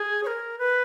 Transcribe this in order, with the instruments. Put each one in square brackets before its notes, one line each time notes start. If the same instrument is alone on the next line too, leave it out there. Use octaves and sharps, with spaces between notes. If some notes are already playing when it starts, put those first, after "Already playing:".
Already playing: [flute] G#4
C#5
A#4
B4